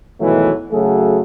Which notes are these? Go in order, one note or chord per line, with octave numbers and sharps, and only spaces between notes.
G#2 B2 D#3 E3 F#3 A3
C#3 F#3 A3 F#4 G#4 A4